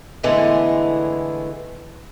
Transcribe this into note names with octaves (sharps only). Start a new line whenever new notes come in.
D3 E3 G#3 A3 B3